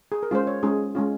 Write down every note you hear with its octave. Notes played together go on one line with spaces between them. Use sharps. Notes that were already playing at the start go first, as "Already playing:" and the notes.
G#4
A#4
G#3 C#4 F4 C5
C#5
G#3 C#4 F4 G#4
G#3 C#4 F4